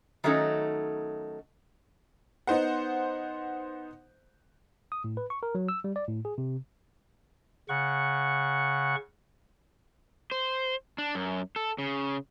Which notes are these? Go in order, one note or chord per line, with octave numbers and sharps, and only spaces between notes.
D#3 F#3 A3 C#4 D#4 A4
B3 D#4 C5 F#5
D#6
A2
B4
C#6
A#4
F#3
E6
G3
D5
A2
G#4
C3
C#3 F#5 C#6
C5
D4
F#2
A4
C#3